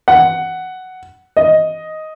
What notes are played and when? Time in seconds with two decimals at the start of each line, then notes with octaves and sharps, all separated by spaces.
0.08 F#5
1.37 D#5